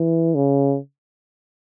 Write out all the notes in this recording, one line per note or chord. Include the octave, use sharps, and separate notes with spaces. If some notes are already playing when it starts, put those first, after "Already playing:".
Already playing: E3
C#3